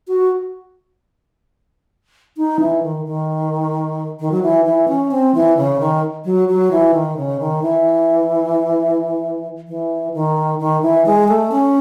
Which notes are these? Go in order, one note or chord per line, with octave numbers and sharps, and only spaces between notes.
F#4
D#4
E3
D#3
D#3
D#3
F#3
E3
E3
C#4
C4
E3
C#3
D#3
F#3
F#3
E3
D#3
C#3
D#3
E3
E3
D#3
D#3
E3
G#3
A3
C#4